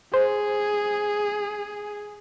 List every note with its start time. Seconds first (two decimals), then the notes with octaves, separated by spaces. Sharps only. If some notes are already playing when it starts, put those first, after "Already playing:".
0.14 G#4 C5